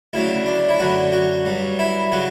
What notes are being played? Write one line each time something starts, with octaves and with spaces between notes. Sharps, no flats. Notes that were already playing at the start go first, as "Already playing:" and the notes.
D2 C#3 F#3 E4
D4
E4
F#2 D3 F#3 F#4
F#4
G2 F#3
E4
C#3 F#3 F#4